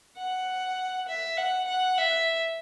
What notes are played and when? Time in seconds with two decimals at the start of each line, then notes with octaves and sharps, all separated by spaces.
0.17 F#5
1.07 E5
1.37 F#5
1.67 F#5
1.98 E5